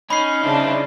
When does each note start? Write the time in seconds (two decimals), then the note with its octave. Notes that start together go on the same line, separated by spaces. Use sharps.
0.10 C#4 D#4 B5 C7
0.43 C#3 D4 E4 C5